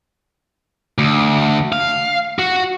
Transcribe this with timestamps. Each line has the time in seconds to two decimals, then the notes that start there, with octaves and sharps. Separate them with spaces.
0.98 D2
1.73 F5
2.39 F#4